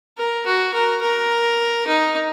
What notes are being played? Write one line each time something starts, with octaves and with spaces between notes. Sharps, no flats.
A#4
F#4
A#4
A#4
D#4